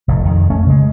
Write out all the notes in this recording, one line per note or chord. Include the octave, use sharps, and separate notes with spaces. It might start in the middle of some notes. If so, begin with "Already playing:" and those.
F1 A2
F2 D#3
A3 C#4
C#3 G#3